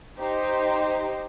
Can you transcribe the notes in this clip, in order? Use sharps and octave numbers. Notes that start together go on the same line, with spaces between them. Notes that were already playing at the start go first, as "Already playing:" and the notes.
D#4 G4 C5